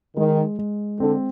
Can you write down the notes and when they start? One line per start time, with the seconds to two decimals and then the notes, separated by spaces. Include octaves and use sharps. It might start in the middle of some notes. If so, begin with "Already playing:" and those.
0.17 D#3 G#3
0.59 G#3
1.00 D3 C4